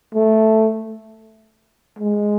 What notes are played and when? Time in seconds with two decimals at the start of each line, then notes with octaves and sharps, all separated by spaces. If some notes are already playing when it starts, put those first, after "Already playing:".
0.15 A3
1.99 G#3